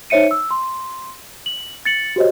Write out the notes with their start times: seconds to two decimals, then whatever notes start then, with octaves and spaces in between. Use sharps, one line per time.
0.10 D#4 C5 C#5 E5 C#7 D#7
0.31 E6
0.51 C6
1.46 F#7
1.85 A6 C#7 F#7
2.16 F#4 G4 C5 C#5 D#5